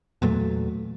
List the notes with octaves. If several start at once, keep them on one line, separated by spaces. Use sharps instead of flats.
E2 A#2 F#3 A3